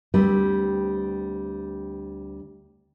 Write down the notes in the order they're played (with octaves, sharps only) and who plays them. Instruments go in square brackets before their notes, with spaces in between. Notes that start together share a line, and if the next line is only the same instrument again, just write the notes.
[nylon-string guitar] D2 G3 C4 B4